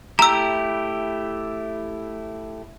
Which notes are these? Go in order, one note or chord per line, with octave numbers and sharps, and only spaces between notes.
A3 E4 G4 A#5 E6